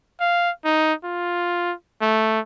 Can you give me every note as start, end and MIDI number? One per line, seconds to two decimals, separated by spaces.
0.20 0.50 77
0.65 0.93 63
1.04 1.73 65
2.01 2.40 57